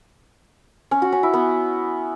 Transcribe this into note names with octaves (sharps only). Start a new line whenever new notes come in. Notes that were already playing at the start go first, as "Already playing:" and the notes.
C#4
F#4
C#4
E4
B3